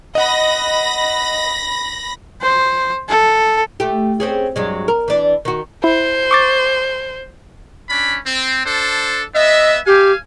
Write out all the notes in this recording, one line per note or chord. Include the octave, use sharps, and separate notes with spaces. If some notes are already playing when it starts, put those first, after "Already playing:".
D#5 F#5 B5 A#6
C5
A4
A3 G4
C4 C#4 G#4
G2 F#3 G#3
A#4
E3 D4
D#3 F#4
E4 C5
C#6 D6 A6
C#4 D4 B5
C4
D4 A4 C5
B3 D#5 E5
G4 F5 G#5